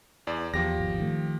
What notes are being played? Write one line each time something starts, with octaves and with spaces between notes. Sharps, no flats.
E2 D5
E2 F3 G4 A#6
G#1 B2
D#3 A3